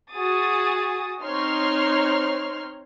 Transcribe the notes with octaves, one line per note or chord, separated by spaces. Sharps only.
F#4 G#4 D#6 A6
C4 D#4 C#5 C6 F6